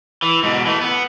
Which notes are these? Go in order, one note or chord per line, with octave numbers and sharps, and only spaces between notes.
E3
G#2 B2
E3 A3
B3